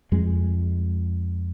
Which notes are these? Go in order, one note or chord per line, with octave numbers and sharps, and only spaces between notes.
F2 G#3